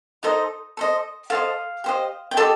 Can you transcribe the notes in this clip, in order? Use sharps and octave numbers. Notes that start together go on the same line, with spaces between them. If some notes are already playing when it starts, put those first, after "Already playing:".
D#4 A4 C5 D#5
A4 C5 D#5
A4 C5 D#5 F5
G4 C5 D#5
G5
G4 A4 C5 D#5 A5